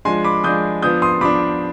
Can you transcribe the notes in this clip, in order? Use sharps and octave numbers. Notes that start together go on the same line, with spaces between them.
F3 G#3 D4 G#5 C6
B5 D6
F3 G#3 D4 D#6 G6
F3 B3 D4 D#6 G6
C6 D#6
F3 B3 D4 B5 D6